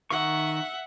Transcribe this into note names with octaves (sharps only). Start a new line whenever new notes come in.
D#3 E5 F#5 C#6